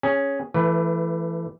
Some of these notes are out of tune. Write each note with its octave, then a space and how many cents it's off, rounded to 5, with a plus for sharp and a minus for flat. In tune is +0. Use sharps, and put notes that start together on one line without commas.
C#4 +0 G#4 +0
E3 +25 A3 +0 B4 +0